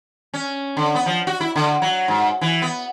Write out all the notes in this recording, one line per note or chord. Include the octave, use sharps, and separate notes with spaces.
C#4
D3
B3
F3
F#4
E4
D3
F#3
G#2
E3
B3